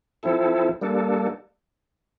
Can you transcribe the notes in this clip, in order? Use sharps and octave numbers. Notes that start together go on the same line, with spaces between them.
F3 C4 E4 A4
G3 A#3 D4 A4